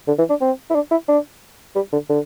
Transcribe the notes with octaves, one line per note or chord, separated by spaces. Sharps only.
D3
E3
D4
C4
E4
D4
E4
D4
G3
D3
D3